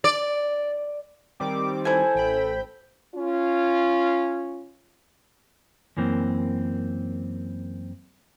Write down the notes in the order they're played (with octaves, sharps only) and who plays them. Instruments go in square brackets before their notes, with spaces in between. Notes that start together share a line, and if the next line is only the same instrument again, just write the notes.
[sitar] D5
[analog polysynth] D#3 G3 C4 [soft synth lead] D6
[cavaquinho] E4 G#5 [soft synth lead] A4 [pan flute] C5
[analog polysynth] A1 G5 B5
[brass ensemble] C#4 F4
[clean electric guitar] F#2 E3 A#3 C4